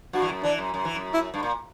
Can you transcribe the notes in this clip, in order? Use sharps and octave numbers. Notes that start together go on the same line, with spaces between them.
G2 F#4
E3
F#2
E3 D4
F#2
F#2
E3
F#2
E4
G2
A#2